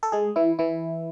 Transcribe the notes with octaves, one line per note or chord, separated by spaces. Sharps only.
A4
G#3 G#4
E3 E4
E3 E4